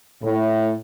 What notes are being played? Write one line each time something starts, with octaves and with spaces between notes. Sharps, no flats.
A2